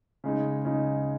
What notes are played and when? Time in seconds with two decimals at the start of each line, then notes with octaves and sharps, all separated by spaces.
0.24 C#3 G#3 D#4
0.65 C#3 G#3 D#4